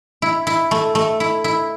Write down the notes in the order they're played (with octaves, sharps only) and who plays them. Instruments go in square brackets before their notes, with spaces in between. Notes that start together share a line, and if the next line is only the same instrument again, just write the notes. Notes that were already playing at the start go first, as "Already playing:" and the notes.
[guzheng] E4
E4
A3
A3
E4
E4